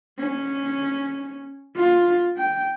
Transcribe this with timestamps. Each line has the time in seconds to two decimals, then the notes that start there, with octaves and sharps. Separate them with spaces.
0.19 C#4
1.77 F4
2.37 G5